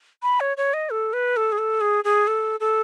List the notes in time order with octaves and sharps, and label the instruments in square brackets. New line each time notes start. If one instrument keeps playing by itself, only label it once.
[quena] B5
C#5
C#5
D#5
A4
B4
A4
G#4
A4
G#4
G#4
A4
A4